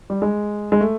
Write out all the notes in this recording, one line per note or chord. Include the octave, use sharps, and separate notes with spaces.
G3
G#3
G#3
A3